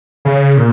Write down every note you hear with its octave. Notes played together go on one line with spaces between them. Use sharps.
C#3
A#2